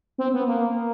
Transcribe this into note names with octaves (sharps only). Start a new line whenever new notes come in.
C4
B3
A#3